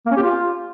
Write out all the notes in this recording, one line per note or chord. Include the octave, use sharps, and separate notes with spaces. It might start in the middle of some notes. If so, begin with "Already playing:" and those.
A#3
C#4
G4
F4